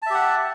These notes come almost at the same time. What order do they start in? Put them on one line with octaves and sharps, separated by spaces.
A5 E5 G4 F#5